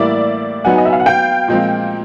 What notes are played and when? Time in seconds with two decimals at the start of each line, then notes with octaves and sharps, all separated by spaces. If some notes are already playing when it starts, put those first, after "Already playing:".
Already playing: A2 E3 G3 A#3 D5 E5
0.64 F#3 B3 D#4 F#5 G#5
0.78 D#5
0.85 E5
0.93 F5
1.00 F#5
1.06 F5 G5
1.48 A#2 F3 G#3 C4